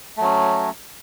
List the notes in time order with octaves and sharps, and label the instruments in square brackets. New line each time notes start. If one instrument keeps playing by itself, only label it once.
[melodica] A3
F#3
C#4